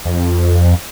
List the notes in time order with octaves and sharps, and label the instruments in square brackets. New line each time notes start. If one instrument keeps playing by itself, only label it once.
[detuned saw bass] F2